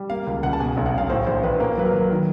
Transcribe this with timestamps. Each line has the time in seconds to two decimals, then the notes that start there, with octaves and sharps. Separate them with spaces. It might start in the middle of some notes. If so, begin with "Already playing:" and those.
Already playing: G3
0.10 A#3 F5
0.27 C#2
0.43 C#2 F#5
0.53 A5
0.60 B2 G#5
0.77 B1
0.86 F#5
0.94 B1 F5
1.10 A2 C5
1.27 A#1 C5
1.43 A#1 B4
1.60 A#3 A#4
1.77 F#3 B4
1.85 A#4
1.93 F#3
2.11 D#3